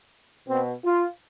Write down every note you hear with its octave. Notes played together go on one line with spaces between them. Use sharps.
B2 C4
F4